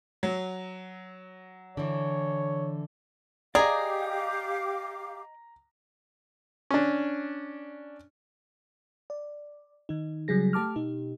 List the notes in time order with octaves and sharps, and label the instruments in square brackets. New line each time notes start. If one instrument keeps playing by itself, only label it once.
[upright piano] F#3
[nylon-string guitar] D3 E3 [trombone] C#5
[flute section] G4 F5 D6 [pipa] G#4 [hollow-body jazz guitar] D5 D#5 [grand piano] A#5
[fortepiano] C#4 D4
[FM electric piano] D5
D#3 D#4
C#3 F#3 G3 G#4 A#6
A3 G4 A5 D6 F6
B2 D#4 G4